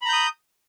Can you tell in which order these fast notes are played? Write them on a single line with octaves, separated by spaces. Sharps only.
B5 A#5 G6 D#6